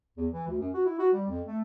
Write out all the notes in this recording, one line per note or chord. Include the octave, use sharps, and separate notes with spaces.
E2
E3
D2
F#2
F#4
E4
F#4
G3
F2
A3